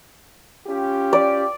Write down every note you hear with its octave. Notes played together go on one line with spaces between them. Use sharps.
C#4 F4 G4
D5